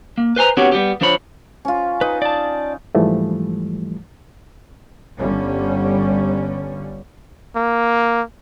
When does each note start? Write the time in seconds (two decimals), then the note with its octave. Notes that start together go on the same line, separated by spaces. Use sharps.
0.18 A#3
0.36 B4 C5 G#5 A#5
0.57 B3 C4 D4 F#4 G4 C#5
0.72 G3 B3 G4
1.01 F3 D4 C5 C#5 B5
1.65 C#4 F4
2.01 D#4 B4
2.22 D5 A5
2.95 G#2 E3 F3 G3 A3
5.18 G1 D3 G3 C#4
7.56 A#3